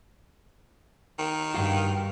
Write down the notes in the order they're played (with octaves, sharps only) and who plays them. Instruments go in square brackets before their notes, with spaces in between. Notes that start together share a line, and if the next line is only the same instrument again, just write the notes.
[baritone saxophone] D#3
[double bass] G2 [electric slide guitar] F#4 F5 G5